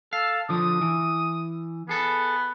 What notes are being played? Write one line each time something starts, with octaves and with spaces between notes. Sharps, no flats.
A4 F5
D3 F3 D#6
E3
B3 G#4 A4